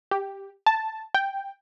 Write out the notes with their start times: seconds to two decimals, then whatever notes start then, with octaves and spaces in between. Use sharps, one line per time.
0.11 G4
0.66 A5
1.14 G5